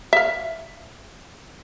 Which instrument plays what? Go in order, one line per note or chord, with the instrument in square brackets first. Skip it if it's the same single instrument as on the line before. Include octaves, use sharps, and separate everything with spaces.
[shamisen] E5 F5